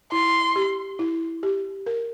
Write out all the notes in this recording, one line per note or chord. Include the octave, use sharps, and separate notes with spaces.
E4 C6
G4
E4
G4
A#4